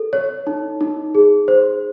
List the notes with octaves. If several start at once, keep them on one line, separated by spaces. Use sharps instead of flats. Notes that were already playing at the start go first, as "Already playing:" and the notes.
Already playing: A4
C#5
D#4
D#4
G#4
C5